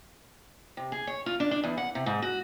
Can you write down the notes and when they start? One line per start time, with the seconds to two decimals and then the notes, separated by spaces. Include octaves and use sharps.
0.77 C3
0.92 G#4
1.07 C#5
1.26 F4
1.40 D4
1.51 D4
1.64 E2
1.78 F#5
1.95 C3
2.06 G#2
2.22 F#4